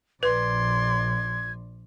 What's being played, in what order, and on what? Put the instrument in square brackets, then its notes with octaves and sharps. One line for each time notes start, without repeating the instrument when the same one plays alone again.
[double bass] A#1 [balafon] B4 [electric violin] D5 C6 [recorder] G#6